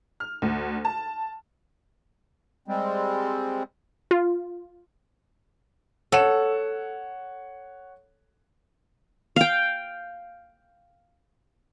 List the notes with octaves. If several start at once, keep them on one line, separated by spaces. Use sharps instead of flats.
F6
D2
A5
G3 G#3 C4
F4
A4 C#5 F#5 E7
F5 G5